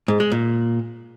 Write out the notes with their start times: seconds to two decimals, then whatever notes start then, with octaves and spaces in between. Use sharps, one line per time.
0.08 G#2
0.20 G#3
0.32 A#2